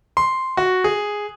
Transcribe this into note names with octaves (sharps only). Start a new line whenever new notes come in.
C6
F#4
G#4